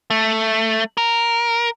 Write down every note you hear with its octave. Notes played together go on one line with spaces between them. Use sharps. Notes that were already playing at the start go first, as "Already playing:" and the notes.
A3
A#4